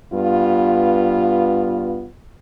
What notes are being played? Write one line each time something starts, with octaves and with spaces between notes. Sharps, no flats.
G2 B3 F4